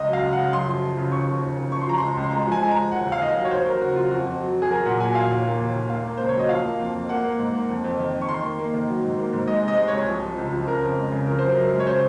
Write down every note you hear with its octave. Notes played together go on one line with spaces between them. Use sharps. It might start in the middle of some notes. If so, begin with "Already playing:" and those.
Already playing: C#2 D#5
F#3
F5
C#2
F#5
C#3
F#2 C6
F3
F3
C#3
D#2 C#6
F3
D#2
C#3
F3 C#6
C6
F3 A#5
C#2 C6
C#2
C6
G#3 A#5
F3
G#5
G#3
F3 A#5
D#2 F#5
D#2
F5
D#2 D#5
F#3
C#5
D#2 C5
F#3 A#4
C#3 F#4
F#3 F4
F2 F#4
F2
F#3
F#3
G#4
F#3 A#4
A#2 F#5
F#3 G#5
A#2 F5
D#2
A#3
D#2
D#2
A#3 F5
A#3
C#2 C5
C#5
F#3 D#5
F3 F5
A#3
F2
F2
A#3 F#5
A#3
G#2
A#3
F2
F2
D#3
F2
C#6
D#3 C6
A#3
A#3
D#3
F#3
G#2
A#3
G#2
G#3 D#5
C3 D#5
G#3
C2 C#5
F3
F3
C#2
F3
C#3 A#4
F2
G#3
C#3
F3 A#4
F#2 C5
A#4
F#2
G#3
C#5
C#3 C5